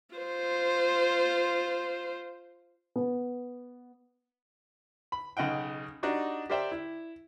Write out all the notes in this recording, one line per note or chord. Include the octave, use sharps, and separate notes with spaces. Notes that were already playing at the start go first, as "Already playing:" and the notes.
F4 C5
B3
B5
B1 C#3 D#5 F#5 G5
D4 D#4 F#4 G4
G4 A#4 C5 D5 E5 G5
E4